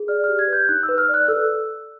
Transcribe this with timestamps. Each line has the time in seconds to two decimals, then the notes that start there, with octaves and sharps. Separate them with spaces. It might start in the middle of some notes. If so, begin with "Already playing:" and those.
Already playing: G#4
0.08 D5 F6
0.24 G4 F6
0.39 G#6
0.48 B4
0.53 G6
0.69 D#4 F#6
0.83 E6
0.89 B4
0.98 F6
1.09 D5
1.14 F#6
1.28 A4 E6